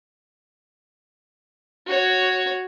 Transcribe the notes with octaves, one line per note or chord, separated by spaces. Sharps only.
F#4 C#5